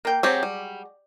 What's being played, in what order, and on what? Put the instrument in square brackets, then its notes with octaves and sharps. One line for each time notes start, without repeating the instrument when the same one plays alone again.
[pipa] A#3 G5
[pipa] F#3 G#3 [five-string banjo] C4 G4 C#5
[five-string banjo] G3